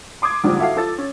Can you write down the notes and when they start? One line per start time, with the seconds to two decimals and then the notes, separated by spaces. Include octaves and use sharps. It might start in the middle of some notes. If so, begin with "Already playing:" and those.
0.22 C6 D6 D#6 G#6
0.44 A#1 G#2 D3 F3 G3
0.60 E4 F#4 A4 F5
0.76 F3 A4 E6 A6
0.98 C#4